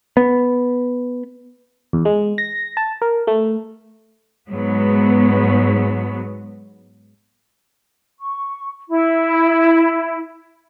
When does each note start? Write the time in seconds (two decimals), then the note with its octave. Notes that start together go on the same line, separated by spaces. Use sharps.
0.17 B3
1.93 E2
2.05 G#3
2.38 A#6
2.77 A5
3.02 A#4
3.27 A3
4.50 G#2 F#3 B3
8.19 C#6
8.89 E4